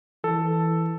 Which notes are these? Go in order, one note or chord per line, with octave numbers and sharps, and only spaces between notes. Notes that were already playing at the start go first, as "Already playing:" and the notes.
E3 A4